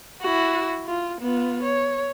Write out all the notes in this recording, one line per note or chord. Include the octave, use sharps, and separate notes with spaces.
E4 F#4
F4
B3 F4
C#5